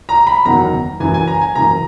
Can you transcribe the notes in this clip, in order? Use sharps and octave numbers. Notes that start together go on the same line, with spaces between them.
A#5
B5
F#1 E2 D#3 F#3 A#5
F#1 F#2 E3 G#5
G#5
A#5
G#5
F#1 F#2 E3 A#5